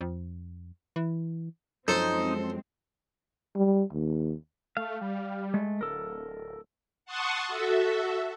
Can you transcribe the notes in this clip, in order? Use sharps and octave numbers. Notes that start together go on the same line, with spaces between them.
F2
E3
F#2 F3 F#3 G#3 C4 D#4 A4 C5
G3
D#2
A3 F5
G3
G#3 A3
D1 A4 A#4
F#5 A5 C6 C#6 D#6
F#4 A4 E5